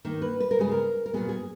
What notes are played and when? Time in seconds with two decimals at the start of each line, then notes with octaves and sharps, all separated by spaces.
0.05 D#3 A#3
0.22 B4
0.40 B4
0.51 A#4
0.59 C#3 G#3 B3 G#4
0.72 A#4
1.06 A#4
1.13 A#2 F#3 B3 G#4
1.29 G#4